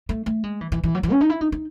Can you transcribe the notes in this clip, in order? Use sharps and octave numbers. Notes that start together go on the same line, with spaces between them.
A3
A3
G#3
E3
E3
E3
F#3
E3
C#4
D#4
E4
D#4
D#4